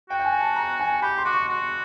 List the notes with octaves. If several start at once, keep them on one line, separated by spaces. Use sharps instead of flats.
F#4 G5
G5
G#5
A5
A#5
G#5
G4 B5
C6
F#4 D6
C#6
F#4